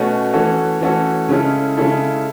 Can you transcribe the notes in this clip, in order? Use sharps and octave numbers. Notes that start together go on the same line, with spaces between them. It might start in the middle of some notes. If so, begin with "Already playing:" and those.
Already playing: B2 A3 C#4 F#4
E3 A3 C#4 F#4 A4
E3 A3 C#4 F#4 A4
C#3 G#3 C#4 E4 A4
C#3 G#3 C#4 E4 A4